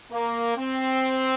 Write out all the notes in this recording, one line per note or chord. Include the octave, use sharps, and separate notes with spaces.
A#3
C4